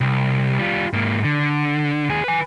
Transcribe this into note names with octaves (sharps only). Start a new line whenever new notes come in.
C2
G3 F4
G#2 A#3
D3
D#2 G#4
B4 G#5